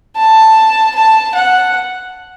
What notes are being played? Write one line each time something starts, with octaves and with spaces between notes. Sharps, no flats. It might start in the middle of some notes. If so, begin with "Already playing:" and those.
A5
A5
F#5